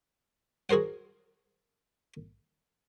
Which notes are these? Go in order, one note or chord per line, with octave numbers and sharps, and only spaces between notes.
F#4 G#4 A#4 C5 F#5